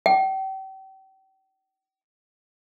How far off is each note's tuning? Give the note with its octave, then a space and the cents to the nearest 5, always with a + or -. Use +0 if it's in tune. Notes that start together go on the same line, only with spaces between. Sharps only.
G5 -35